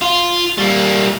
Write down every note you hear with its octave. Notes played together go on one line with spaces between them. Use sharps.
F4
G3 A#3